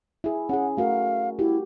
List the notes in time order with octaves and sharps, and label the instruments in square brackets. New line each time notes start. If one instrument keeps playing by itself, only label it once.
[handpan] E4 G#4
[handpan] C#4 G#4 [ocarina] F#5
[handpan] A3 F#4 A#4 [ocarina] F5
[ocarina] E4 [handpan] F#4 G4